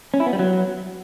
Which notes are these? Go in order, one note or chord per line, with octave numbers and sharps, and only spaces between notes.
C#4
E4
B3
G3
F#3